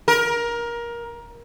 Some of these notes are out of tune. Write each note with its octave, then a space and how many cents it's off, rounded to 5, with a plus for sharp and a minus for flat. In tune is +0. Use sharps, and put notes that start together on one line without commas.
A#4 +20